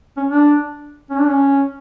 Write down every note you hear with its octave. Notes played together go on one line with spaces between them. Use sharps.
C#4
D4
C#4
D4
C#4